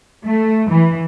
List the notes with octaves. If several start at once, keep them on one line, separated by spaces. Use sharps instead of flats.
A3
E3